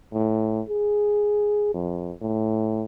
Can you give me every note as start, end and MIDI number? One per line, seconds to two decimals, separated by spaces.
0.13 0.61 45
0.68 1.70 68
1.74 2.13 41
2.21 2.85 45